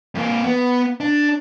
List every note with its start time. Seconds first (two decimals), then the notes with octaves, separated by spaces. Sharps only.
0.15 F2 A#3
0.44 B3
1.00 D4